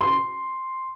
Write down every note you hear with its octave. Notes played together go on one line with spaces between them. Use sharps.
C6